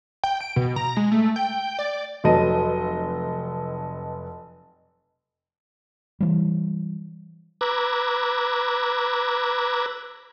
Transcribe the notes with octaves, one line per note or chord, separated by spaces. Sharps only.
G5
D7
B2
A#5
G#3
A3
G5
D5
F1 F#3 A4 B4 D#5 D#7
E3 G3
B4 A#5 D6 E6 F#6 G#6